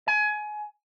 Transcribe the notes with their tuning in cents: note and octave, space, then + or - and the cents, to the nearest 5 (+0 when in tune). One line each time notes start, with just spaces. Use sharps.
G#5 +25